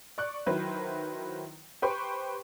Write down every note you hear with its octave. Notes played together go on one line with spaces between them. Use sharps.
D5 C#6 F#6
D#3 F#3 E4 B4 C5
G4 B4 C5 G5 C6 C#6